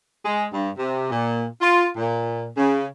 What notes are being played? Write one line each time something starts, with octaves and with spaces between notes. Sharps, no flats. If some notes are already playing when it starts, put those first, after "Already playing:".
G#3
G2
C3
A#2
F4
A#2
C#3